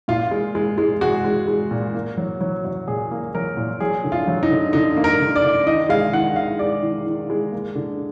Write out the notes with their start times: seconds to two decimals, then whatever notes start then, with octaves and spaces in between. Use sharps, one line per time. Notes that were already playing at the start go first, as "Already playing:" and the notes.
0.08 A#2 F4
0.31 G#3
0.55 G#3
0.78 G#3
1.01 G#3 F#4
1.25 G#3
1.48 G#3
1.71 A#2
1.94 A#3
2.17 F#3
2.41 F#3
2.65 F#3
2.88 A#2 G#4
3.11 A#3
3.35 F#3 A#4
3.57 A#2
3.80 F#3 G#4
4.04 D3
4.12 F4
4.27 F#3
4.43 D#4
4.51 D3
4.73 D3 D#4
4.97 A#3
5.04 A#4
5.20 D3
5.36 D5
5.43 D3
5.67 D#3 D#5
5.89 G#3 F5
6.13 D#3 F#5
6.36 D#3 F5
6.59 G#3 D5
6.83 D#3
7.06 D#3
7.30 G#3
7.52 A#3
7.75 D3